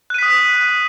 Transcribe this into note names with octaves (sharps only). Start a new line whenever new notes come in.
D#6 F#6 B6 D#7